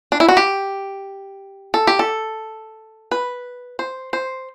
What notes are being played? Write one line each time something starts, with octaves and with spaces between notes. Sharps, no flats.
D4
E4
F#4
G4
A4
G4
A4
B4
C5
C5